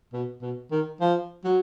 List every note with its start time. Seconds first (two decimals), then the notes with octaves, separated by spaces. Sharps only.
0.13 B2
0.42 B2
0.71 D#3
1.01 F3
1.44 F#3